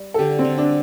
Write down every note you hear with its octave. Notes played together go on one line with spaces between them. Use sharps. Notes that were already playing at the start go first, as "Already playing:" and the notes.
Already playing: G3
A4
D3 G4
C4
D3
D4